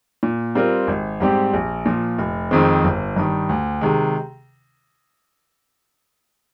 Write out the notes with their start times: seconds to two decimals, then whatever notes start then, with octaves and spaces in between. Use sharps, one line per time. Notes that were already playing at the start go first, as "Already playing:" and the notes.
0.23 A#2
0.55 G3 C4 F4 A#4
0.87 G#1
1.20 G#2 G3 C4 G4
1.54 A#1
1.86 A#2 F3
2.19 F1
2.51 F2 D#3 G#3 C4
2.84 G1
3.16 G2 D#3
3.49 D2
3.81 C3 D#3 G#3